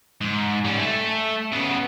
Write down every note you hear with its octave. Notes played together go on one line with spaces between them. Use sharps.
G#2
G3 C#4
A3
C#3 B3